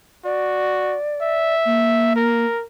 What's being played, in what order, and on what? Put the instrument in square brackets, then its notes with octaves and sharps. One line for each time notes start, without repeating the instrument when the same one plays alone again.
[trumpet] F#4 [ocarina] D5
[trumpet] E5
[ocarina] A#3
[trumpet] A#4